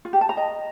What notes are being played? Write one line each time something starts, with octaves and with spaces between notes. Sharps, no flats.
F4
G4
A5
A#5
D#5